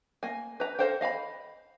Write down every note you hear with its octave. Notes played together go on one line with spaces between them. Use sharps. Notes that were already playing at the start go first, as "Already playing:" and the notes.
A#3 G#5
B4 A#5
A4 A#4 C5 F5 G5
D#5 F5 G#5 B5